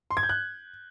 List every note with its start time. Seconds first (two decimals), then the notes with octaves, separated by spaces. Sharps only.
0.11 C6
0.17 G#6
0.23 G6
0.29 F#6